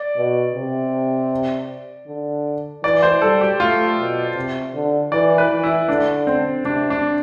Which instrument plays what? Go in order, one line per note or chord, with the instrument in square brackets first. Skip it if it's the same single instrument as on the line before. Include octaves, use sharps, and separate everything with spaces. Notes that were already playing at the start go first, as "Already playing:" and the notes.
Already playing: [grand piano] D5
[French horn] B2
C3
D3
[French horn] E3 [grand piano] D5
[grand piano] C5
[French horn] G3 [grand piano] A4
[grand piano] G4
[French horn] A3 [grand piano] F4
[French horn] B2
C3
D3
[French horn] E3 [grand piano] D5
[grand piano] B4
[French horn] E3
[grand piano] E4
[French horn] D3 [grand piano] D4
[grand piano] C4
[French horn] C3 [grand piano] D4
[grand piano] D4